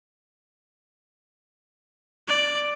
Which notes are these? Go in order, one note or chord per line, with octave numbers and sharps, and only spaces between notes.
D5